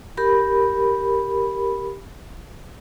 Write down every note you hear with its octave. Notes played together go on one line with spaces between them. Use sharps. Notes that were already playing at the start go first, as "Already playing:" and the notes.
G4 A#4 B5